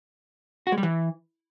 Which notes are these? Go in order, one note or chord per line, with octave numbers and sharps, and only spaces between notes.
F#4
G#3
G3
E3